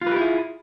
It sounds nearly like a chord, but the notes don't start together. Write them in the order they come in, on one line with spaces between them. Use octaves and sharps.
F4 B4 G4 E4 G#4